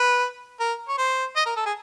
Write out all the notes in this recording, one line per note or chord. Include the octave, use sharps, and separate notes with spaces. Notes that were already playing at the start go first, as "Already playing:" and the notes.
Already playing: B4
A#4
C#5
C5
D#5
A#4
A4
G#4